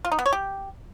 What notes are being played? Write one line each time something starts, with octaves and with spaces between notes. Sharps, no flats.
F4
D#4
B3
C#5
G4